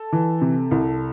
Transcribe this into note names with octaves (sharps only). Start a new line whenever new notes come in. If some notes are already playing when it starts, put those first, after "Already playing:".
Already playing: A4
E3
C3
C2